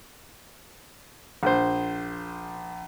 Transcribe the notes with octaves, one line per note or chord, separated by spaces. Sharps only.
A#1 C5